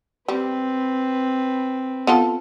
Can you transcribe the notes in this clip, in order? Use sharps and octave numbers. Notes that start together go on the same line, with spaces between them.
G3 C4 B4
B3 F4 A4